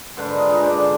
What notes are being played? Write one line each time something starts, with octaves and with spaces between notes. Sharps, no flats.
G#2 D3 B4 C6
D#4 F4
D#4 G#4
D4 C5 D6
D3